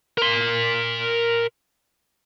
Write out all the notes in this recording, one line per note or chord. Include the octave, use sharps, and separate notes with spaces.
A#4 C6